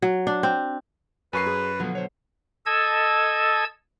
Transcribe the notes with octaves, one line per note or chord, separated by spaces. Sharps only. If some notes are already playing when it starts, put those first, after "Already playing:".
F#3
D4
C4
F#2 A#4 B4 F5 G#5 C#6 C7
G#4
B2 D3 F3 F#3 B3
C5 C#5
A4 D#5 A5 E6 G#6